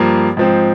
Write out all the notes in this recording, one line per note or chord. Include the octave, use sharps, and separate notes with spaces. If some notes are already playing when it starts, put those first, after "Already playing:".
Already playing: G2 F3 A#3
G#2 F3 C4